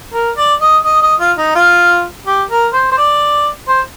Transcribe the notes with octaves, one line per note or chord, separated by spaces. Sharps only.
A#4
D5
D#5
D#5
D#5
F4
D#4
F4
G4
A#4
C5
C5
D5
C5